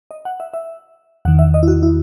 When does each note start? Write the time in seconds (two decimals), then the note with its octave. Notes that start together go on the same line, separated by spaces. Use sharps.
0.11 D#5
0.25 F#5
0.40 E5
0.54 E5
1.25 E2 D#3 F#5
1.39 E5
1.54 D#5
1.63 E4
1.68 F#4
1.83 E4